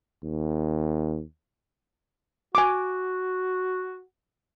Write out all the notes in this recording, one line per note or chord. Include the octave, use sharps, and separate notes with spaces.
D#2
F#4 G#5 D6